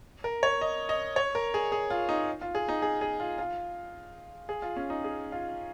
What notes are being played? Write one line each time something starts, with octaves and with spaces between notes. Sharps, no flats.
A#4
C#5
D#5
D#5
C#5
A#4
G#4
G#4
F4
D#4
F4
G#4
D#4
G#4
G#4
F4
F4
G#4
F4
C#4
D#4
G#4
F4